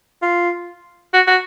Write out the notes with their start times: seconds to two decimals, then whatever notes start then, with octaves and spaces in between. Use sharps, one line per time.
0.22 F4
1.13 F#4
1.27 F#4